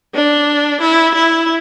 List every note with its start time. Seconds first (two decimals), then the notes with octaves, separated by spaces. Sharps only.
0.14 D4
0.81 E4
1.15 E4